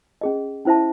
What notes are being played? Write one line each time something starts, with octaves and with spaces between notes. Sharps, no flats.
C#4 G#4 D#5
C#4 E4 C5 E5 A5